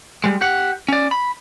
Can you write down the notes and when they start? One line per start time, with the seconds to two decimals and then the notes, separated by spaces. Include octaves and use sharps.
0.24 G3 G#3
0.41 G4 F#5
0.89 C#4 D5
1.11 B5